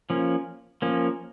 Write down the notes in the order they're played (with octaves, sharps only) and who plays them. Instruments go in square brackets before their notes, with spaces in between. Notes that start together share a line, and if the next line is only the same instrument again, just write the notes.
[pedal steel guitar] F3 A#3 C#4
F3 A#3 C#4